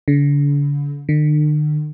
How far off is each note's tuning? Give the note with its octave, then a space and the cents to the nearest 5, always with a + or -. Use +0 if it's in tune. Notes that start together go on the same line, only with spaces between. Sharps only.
D3 -40
D3 +45